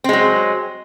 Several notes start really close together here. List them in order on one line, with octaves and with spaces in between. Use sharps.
C4 G#3 F#3